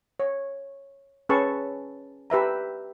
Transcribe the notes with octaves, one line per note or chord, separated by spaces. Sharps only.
C#5
C#4 G#4 B4 A5 C#6 E6
G4 B4 E5 A#5